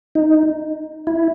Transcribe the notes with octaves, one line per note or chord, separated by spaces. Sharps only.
D#4
E4